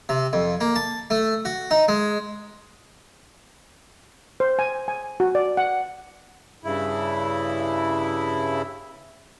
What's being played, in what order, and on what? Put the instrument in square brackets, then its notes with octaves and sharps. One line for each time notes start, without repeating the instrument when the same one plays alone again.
[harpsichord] C3
F2
A#3
A5
A3
F#4
D#4
G#3
[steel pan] C5
G#5
G#5
F#4
D5
F#5
[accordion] G2 C#3 E4